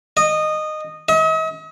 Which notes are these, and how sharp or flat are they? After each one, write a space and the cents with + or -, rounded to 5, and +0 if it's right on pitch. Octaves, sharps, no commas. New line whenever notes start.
D#5 -15
D#5 +45